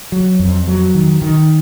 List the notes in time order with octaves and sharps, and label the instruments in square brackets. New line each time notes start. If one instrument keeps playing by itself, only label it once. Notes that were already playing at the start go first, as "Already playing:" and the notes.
[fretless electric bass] F#3
F2
F#3
D#3
D#3